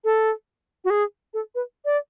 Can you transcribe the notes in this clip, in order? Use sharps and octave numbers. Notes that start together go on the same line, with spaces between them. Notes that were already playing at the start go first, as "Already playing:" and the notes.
A4
F#4
G#4
A4
B4
D5